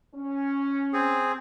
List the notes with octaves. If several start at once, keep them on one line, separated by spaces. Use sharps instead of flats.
C#4
C4 G#4